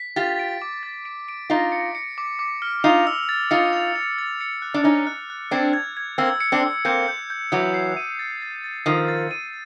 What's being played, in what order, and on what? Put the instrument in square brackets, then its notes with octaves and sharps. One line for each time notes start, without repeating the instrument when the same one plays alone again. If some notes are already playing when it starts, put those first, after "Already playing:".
Already playing: [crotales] B6
[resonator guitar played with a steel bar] F4 G4 [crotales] A6
[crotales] D7
D6
A6
D7
D7
[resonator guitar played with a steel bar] D#4 F4 [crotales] A#6
[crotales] C#7
C#7
D6
D6
F6
[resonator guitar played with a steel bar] D#4 F4 [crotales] F7
[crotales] E6
A6
[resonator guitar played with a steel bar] D#4 F4 [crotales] C#7
[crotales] F7
F7
A6
C#7
F#6
[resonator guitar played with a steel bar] D4
[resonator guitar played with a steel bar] C#4 D#4 [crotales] A6
[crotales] F#6
F#6
[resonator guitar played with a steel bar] C4 D4 [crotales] G#6
[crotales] G#6
G#6
[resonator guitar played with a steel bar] A#3 C4 [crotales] E6
[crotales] C#7
[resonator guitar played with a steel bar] C4 D4
[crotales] E6
[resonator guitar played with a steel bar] A#3 C4 [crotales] G6
[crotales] G6
G6
[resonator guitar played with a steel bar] E3 F#3 [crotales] D#6
[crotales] C7
D#7
A6
A6
A6
[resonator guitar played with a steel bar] D#3 F3 [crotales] D#7
[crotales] A6
D#7